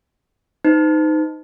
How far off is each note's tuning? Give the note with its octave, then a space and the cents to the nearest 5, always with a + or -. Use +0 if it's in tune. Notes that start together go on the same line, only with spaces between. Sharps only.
D#4 +0 C5 -45